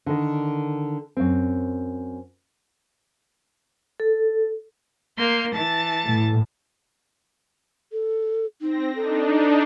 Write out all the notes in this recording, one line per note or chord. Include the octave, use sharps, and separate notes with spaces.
D3 D#3
F#2 C4
A4
A#3 C6 G6
E3 A5 A6
A2
A4
C4 D#4 A#6
D4 D#4 A4